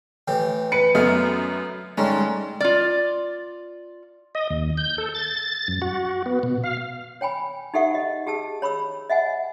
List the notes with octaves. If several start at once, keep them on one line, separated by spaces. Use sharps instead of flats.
A2 E3 G4
B4 C#7
F#2 A3 B3 F5
G#2 G3 A3 C#4
F4 D5
D#5
D#2
G6
A4
A6
F#2
F#4
B3
B2
F5
C#5 G5 G#5 B5
D#4 G4 A4 E5 F#5 C#6
D#5
G4 G#4 A5 E6
C#5 B5 C#6 E6
D#5 E5 F#5 G#5